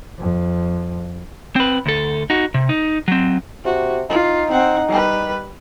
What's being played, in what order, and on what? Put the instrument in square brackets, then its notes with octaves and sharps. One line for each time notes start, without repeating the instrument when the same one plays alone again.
[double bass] F2
[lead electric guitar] C4 B4
D2 A4
D#4 F#4
C3
D#4
F#3 C4
[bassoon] C3 [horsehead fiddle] F#4
[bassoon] D#4 [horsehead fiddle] F4
[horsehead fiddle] C4 F#5
G3 B4